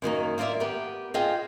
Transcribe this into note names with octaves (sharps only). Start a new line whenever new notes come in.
F#2 D#3 A#3 D#4
A#3 F4 B4 D5 E5
B3 G4 A#4
F4 G#4 C5 D#5 F5 G5